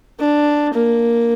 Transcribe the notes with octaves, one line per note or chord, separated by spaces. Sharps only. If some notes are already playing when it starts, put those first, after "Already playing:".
D4
A#3